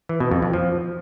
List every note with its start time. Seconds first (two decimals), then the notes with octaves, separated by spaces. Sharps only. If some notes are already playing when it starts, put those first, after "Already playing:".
0.09 E3
0.20 B2
0.31 F2
0.42 F2
0.53 F3